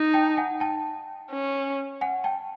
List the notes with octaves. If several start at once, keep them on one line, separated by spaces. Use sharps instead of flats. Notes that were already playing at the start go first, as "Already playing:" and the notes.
Already playing: D#4
G5 A5
F#5 G#5
G5 A5
C#4
F#5 G#5
G5 A5